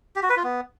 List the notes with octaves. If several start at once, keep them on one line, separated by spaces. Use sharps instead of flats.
G4
F#4
B4
F4
B3